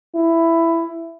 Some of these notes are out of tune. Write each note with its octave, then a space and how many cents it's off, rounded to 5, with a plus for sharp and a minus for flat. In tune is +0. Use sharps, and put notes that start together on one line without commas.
E4 +10